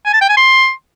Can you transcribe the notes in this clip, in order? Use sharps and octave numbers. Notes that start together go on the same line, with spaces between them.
G#5
A5
G5
G#5
C6